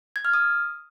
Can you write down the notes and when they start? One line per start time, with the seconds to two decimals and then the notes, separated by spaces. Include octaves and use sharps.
0.16 G#6
0.25 F6
0.34 D#6